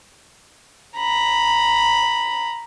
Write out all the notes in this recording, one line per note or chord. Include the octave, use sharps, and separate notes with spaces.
A#5 B5